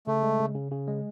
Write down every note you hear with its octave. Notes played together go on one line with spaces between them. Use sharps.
C#3 A3
G#3
C#3
C#3
C#3
G#3